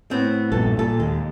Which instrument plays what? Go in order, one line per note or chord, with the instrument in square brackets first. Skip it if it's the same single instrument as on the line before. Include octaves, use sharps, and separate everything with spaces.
[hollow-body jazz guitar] A2 B3 C4
[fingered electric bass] A#1 G2 A#2 [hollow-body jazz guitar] A4
[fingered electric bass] A#2 [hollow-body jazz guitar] A4
[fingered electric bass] D#2 [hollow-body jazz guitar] G#3